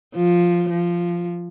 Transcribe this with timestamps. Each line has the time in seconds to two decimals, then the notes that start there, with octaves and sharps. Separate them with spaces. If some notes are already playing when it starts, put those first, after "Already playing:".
0.15 F3
0.70 F3